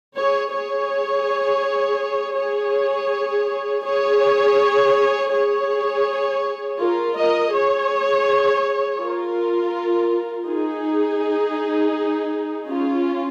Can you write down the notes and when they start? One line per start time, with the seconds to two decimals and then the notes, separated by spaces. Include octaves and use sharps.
0.17 G#4 C#5
0.53 G#4 C#5
2.37 G#4 C#5
3.85 G#4 C#5
5.32 G#4 C#5
6.79 F4 A#4
7.16 A#4 D#5
7.52 G#4 C#5
9.00 F4 A#4
10.47 D#4 G#4
12.68 C#4 F4